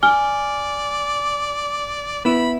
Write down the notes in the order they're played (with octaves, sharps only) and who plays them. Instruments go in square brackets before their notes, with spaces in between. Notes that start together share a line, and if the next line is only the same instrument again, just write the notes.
[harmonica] D5 [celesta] G#5 F6 G7
[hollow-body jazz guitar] B3 E4 [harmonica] B5